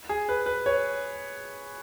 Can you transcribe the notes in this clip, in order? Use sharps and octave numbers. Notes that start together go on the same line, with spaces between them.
G#4
B4
B4
C#5